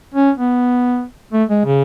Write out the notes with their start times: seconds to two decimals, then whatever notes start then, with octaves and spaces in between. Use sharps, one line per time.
0.14 C#4
0.37 B3
1.33 A3
1.50 G#3
1.65 C#3